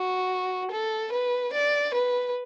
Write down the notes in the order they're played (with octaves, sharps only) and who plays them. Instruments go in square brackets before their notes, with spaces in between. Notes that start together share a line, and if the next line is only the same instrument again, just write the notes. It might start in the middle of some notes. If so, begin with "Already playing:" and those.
Already playing: [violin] F#4
A4
B4
D5
B4